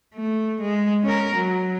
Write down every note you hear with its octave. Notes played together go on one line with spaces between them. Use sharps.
A3
G#3
C#4 A#4
F#3